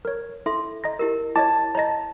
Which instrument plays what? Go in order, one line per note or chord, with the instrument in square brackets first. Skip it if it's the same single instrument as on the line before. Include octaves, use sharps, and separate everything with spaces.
[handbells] A#4 C#5
[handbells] E4 [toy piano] A4 E5 C6
[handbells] D#5 A#5 A#6
[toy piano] E4 G4 A#4
[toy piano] E4 [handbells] C#5 D#5 D6 [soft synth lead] A5
[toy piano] C#5 D#5 [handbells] A#5 A#6